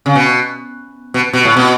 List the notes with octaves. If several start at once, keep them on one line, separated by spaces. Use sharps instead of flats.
C#3
B2
B2
B2
A2
B2